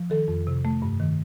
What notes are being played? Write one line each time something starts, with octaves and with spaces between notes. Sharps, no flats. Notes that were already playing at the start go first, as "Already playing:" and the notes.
Already playing: F3
D#3 A4
F2
C3
A3
G2
D#3